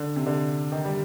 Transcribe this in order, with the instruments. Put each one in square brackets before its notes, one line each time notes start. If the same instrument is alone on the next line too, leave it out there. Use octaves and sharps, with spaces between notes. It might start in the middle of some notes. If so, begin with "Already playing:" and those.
Already playing: [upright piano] D3
C3
D3
D#3
G3